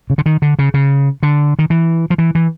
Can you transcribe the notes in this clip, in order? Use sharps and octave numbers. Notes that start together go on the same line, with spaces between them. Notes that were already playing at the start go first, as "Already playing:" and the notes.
C#3
D3
D#3
D3
C#3
C#3
D3
D#3
E3
F3
E3
E3